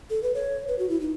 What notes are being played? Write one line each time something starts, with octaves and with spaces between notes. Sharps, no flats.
A4
B4
C#5
B4
F#4
E4
D#4